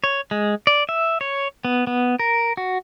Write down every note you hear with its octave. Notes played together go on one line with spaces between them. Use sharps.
C#5
G#3
D5
E5
C#5
B3
B3
A#4
F#4